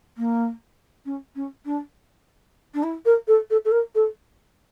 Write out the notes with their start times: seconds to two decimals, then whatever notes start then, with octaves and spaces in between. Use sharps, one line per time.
0.17 A#3
1.05 C#4
1.35 C#4
1.65 D4
2.74 D4
2.83 E4
3.05 A#4
3.27 A4
3.50 A4
3.65 A4
3.71 A#4
3.95 A4